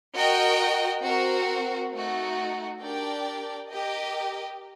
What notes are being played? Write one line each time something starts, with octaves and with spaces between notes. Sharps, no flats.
F#4 A#4 D#5 G5
C4 F#4 A#4
A3 D#4 F#4
D4 G4 A#4 D5 G5
G4 A#4 D#5 G5